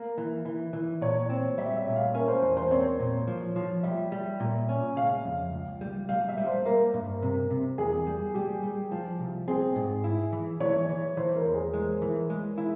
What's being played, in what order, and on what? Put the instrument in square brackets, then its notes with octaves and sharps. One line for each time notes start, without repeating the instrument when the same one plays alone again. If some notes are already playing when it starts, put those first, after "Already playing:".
Already playing: [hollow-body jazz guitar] A#3
E3
E3
E3
[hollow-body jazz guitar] A#2 [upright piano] C#5
[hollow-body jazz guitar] C4
[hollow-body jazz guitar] G3 [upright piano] E5
[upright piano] E5
[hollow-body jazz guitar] A#2
[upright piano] F5
[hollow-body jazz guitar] C#4 [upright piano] A#4
[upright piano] C5
[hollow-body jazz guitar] E2 [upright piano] C5
[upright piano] C5
[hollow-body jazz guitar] C4 [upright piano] C#5
[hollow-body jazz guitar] A#2
F3
F3
[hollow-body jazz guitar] G3 [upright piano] E5
[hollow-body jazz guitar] G3
A#2
C#4
[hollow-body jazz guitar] C#3 [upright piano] F5
[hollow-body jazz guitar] F2
C#2
G3
[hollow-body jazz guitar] G3 [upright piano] F5
[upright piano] E5
[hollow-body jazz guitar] G3
[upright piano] C5
[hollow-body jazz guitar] A#3 [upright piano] A#4
[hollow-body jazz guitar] G2
C3
C3
[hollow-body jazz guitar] E2 [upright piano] G#4
[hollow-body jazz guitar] G3
[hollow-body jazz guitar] G3 [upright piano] G4
[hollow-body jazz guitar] G3
F3
C2
[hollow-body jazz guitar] C4 [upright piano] G#4
[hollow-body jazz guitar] G#2
E4
E3
[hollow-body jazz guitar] E3 [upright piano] C#5
[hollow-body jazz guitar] E3
[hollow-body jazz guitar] E3 [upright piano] C5
[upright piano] A#4
[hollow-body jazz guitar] E2
[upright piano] G#4
[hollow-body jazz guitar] G#3
E3
G#3
E4